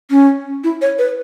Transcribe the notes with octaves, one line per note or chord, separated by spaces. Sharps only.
C#4
E4
C#5
B4